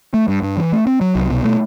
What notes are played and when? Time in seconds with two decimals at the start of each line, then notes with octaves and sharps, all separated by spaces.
0.14 A3
0.28 G2
0.42 G2
0.57 E3
0.72 A3
0.87 C4
1.01 F#3
1.15 C2
1.30 B2
1.45 A3